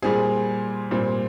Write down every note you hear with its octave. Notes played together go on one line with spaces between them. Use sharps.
A#2 G3 C4 G#4
A#2 G3 C4